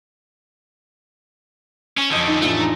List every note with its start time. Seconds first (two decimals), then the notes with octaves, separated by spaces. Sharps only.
1.97 C#4 C#6 E7
2.10 F2 D3 C#4 D#5 G6
2.28 D#4
2.42 A1 A3 D4 F4
2.60 A#5